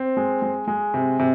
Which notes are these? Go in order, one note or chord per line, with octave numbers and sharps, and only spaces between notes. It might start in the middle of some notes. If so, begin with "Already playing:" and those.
Already playing: C4
G#3
G#3
G#3
C3
C3